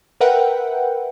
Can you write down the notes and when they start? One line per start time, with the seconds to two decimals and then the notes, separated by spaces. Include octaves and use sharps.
0.21 A#4 B4 E5 F#5 G5